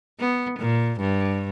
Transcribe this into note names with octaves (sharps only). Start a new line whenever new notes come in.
B3
A#2
G2